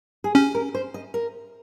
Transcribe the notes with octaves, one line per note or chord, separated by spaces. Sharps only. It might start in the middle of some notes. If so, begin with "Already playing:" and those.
G#4
C#4 G4
A#4
C5
D#5
A#4